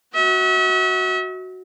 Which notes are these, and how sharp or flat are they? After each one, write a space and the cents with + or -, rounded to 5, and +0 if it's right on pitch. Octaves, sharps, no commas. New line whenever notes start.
F#4 +0 E5 -40